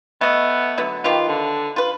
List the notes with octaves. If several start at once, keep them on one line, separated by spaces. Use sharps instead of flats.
A3 B3 D#5
D3 F#3 B3
D#3 F4 G4 B4
D3
F4 B4